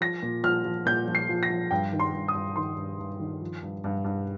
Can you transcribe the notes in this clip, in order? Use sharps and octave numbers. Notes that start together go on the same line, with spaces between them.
F3 A#6
A#2
F3 F6
F3
A#2 G6
F3
C7
F3
A#6
F3
G2 G5
D#3
C6
G2
D#6
G2
D#3 C6
G2
G2
D#3
F3
G2
G2
G2